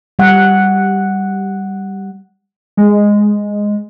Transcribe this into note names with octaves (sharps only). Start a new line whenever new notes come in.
G3 F#5
G#3